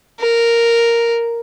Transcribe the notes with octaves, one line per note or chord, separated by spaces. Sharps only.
A#4